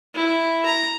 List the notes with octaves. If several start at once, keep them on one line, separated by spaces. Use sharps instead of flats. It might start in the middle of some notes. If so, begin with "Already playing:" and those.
E4
A#5